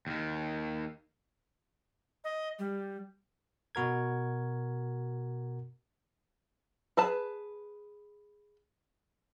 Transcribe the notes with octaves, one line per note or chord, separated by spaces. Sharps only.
D#2 D#3
D#5
G3
B2 F#4 A#4 G#6
G#4 B4 A5